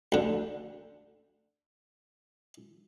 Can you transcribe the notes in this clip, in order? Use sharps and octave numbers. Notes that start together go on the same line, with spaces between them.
D2 D3